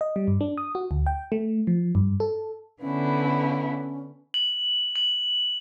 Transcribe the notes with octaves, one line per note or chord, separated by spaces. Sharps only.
D#5
G3
G2
D4
D#6
F#4
D2
G5
A3
F3
G2
A4
D3 B3 C#4 E4
F#7
F#7